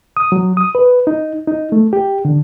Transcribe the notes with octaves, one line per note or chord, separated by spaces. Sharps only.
D#6
F#3
D#6
B4
D#4
D#4
A3
G4
D3